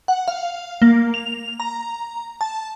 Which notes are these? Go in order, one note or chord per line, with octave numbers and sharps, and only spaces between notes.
F#5
F5
A#3
F7
A#5
A5